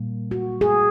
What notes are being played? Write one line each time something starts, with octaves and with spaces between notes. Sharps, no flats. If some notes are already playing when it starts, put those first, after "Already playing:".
Already playing: A#2 G3 A#3
F#4
G#4